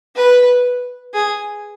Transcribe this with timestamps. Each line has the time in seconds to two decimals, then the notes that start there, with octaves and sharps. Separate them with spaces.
0.16 B4
1.14 G#4